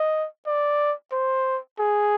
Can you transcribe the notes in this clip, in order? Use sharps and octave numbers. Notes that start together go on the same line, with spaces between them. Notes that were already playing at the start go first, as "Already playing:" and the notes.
Already playing: D#5
D5
C5
G#4